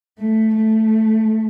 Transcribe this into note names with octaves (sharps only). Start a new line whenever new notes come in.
A3
A3